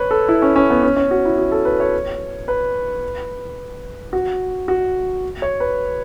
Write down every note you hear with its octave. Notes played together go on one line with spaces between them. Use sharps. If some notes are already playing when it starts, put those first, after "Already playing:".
Already playing: B4 C#5
A4
E4
C#4
C#4
B3
C#4
C#4
F#4
E4
F#4
A4
B4
C#5
B4
F#4
F#4
C#5
B4